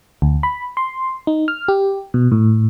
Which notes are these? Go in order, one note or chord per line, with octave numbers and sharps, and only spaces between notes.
D2
B5
C6
D#4
F6
G4
B2
A2